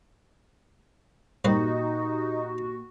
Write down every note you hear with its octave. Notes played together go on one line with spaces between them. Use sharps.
G2 A#2 A#3 D#4 F#4 G4 B4 C5